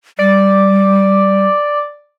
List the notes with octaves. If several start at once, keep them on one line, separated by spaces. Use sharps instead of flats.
G3 D5